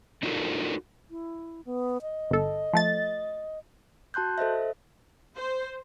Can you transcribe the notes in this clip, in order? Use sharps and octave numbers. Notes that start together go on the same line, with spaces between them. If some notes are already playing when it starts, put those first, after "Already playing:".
D4 D#4 F4 F#4 A4 A#4
E4
B3
D#5
G1 A4
F3 A3 A6
F#4 A5 C6 F#6 G6
A4 C5 D#5 E5
C5